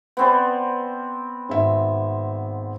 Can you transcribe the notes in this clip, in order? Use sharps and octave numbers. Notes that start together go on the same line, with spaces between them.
B3 C4 D5
G#1 E5